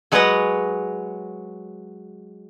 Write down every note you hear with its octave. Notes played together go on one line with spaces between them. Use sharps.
F#3 G#3 B4 C#5 D#5 F#5